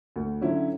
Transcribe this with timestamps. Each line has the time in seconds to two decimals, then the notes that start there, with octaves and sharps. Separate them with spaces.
0.16 D2
0.41 D3 F#3 C#4 E4